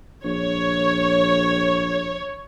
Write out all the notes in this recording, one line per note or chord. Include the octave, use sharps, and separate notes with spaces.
A#1 C#5